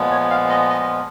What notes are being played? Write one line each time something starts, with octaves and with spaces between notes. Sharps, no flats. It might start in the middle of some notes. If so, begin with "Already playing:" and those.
Already playing: A#2 F3 G#3 B3
C#5
F5
D#5
D#5